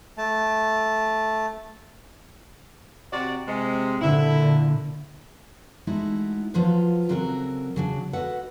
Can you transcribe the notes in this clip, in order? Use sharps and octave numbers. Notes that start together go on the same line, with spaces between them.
A3 A5
C3 F#4 D5
C3 G#3
A#2 D3 E4
G#3 A3 D#4 E4 F#4
F3 F#3 F4 B4
C#3 F#3 C4 F#4 A4 A#4
C#3 F#3 D4
F#4 A4 B4 D#5 F#5